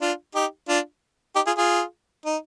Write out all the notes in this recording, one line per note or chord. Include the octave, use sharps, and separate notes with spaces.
D4 F4
D#4 G4
D4 F4
D#4 G4
F4 G#4
F4 G#4
D#4